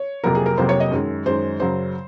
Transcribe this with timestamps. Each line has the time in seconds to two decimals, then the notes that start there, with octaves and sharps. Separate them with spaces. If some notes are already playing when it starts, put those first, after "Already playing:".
Already playing: C#5
0.24 F2 C3 F#3 A#3 A#4
0.35 G#4
0.46 A#4
0.58 F2 C3 F#3 A#3 C5
0.69 C#5
0.80 D#5
0.91 F#2 D#3 G#3
1.26 F#2 D#3 G#3 C5
1.60 F#2 C#3 F#3 C5